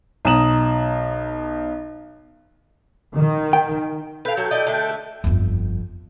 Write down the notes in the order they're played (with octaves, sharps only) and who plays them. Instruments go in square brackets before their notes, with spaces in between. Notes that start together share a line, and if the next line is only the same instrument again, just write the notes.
[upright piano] B1 A#5 D#6 E7 F#7
[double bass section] D#3
[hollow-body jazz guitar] G5
[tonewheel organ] A4 G5 [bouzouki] B4 F5
[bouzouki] F#3
E4 D5 D#5
D3 A3
[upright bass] G1 F2